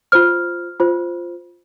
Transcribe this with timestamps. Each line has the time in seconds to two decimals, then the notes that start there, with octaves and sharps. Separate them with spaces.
0.12 F4 C5 F6
0.80 F4 C5